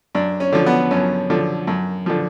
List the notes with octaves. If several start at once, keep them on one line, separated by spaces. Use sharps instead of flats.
F#2 D4
C#4
D3 F3
B3
F#2 C#4
D3 F3
F#2
D3 F3